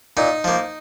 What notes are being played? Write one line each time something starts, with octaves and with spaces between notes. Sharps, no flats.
A#2 D#4
F3 A#3